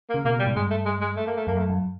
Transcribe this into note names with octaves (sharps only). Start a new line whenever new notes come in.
A#3
C#3
B2 A#3
G3
G#2
G2 G#3
A3
G#3
G#3
A3
A#3
A3
F#2 A#3
A3
F#2